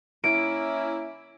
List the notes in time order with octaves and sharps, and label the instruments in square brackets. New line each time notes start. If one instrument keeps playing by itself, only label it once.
[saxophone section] A#3 C#4 E4 [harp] D7